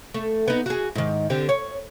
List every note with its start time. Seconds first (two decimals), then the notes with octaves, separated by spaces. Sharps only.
0.14 A3
0.48 B3 D#4
0.66 F#4 G#4
0.95 G#2 D#3
1.30 D3 C4 G4
1.49 C#5